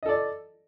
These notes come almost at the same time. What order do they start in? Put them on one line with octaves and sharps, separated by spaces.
D#5 A4 D5